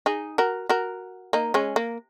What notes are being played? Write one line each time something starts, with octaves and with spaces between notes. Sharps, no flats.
D#4 G#4
F#4 A#4
F#4 A#4
A#3 D#4
G#3 C#4
A#3